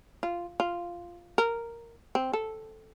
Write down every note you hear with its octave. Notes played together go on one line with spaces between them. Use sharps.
F4
F4
A#4
C4
A4